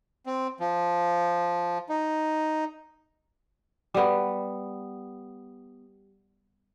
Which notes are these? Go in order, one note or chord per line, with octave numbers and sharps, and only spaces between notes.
C4
F3
D#4
G3 B3